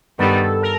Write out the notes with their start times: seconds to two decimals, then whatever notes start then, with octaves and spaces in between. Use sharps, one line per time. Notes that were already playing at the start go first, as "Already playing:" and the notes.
0.19 G2 D#3 G3 B3 A4
0.62 A#4